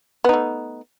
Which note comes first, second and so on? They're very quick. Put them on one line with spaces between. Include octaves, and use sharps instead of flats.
B3 D#4 A3